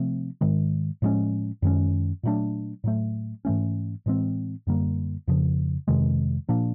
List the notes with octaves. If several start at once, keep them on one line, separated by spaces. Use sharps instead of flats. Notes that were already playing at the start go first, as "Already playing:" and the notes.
Already playing: C3 F3 A3 C4
G#2 D#3 G#3
A2 F3 G#3 C#4
F#2 D#3 G#3 C#4
A#2 F#3 A3 D4
A2 F#3 A3
G#2 E3 A3 C#4
A2 E3 G#3 C4
F#2 D3 G3 A#3
F2 C#3 F3
F2 C3 D#3 G#3
A#2 F3 A#3 D4